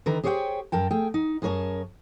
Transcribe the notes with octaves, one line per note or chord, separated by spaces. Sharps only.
D3 D#3 B4 A#5
G4 G#4 C5 C#5 E5 G5
F#2 A#4 G5 A5
A3 G#4 G5
D#4
F#2 G#4 A#4 C#5 A5